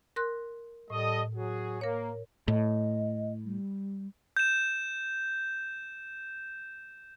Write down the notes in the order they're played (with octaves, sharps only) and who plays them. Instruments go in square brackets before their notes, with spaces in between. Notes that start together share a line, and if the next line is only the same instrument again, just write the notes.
[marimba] A#4 C6 F#6
[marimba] A2 [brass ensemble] G3 A4 D#5
[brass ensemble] F#3 F#4 G#4
[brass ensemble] A#3 [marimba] A#4 C#5
[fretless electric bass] A2 [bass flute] D#5
[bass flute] G3
[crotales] G6 E7